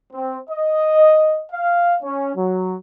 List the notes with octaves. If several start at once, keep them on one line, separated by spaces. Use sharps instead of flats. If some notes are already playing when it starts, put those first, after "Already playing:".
C4
D#5
F5
C#4
F#3